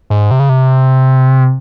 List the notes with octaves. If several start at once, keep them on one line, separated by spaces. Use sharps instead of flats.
G#2
C3
C#3
C3